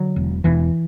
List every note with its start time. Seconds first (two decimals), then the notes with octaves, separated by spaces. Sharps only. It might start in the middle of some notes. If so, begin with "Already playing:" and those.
Already playing: D3 F#3
0.16 E1
0.44 E1 E3